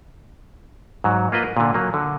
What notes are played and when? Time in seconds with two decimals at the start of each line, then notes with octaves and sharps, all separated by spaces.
1.04 G#2 F#3
1.32 A#3 F4 B4 D#5
1.44 A#4
1.57 A#2 D3
1.74 F#3 A#3
1.94 D3